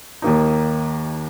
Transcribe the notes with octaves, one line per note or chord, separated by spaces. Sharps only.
D#2 D#3 A#3 D#4